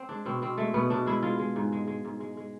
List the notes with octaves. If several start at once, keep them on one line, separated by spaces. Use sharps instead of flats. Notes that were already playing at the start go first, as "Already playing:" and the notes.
Already playing: C4
G#3 D4
B2 C4
B2 C4
G#3 A3
B2 B3
B2 D4
G#3 E4
G#3 F4
G#3
G#2
G#3
G#3
G#2
G#3
G#3